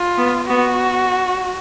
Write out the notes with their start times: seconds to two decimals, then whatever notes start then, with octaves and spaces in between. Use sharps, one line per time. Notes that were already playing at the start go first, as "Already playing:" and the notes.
Already playing: F4
0.18 B3
0.50 B3 F#4